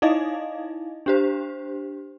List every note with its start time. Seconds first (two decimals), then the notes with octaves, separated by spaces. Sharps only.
0.02 D#4 E4 D#5 F5
1.06 D4 G4 C5